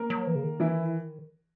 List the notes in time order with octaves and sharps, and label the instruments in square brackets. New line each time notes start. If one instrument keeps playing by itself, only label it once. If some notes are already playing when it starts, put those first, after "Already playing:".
Already playing: [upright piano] A#3 A#4
[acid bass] F#3
E3
C#3
D#3
[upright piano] E3 E4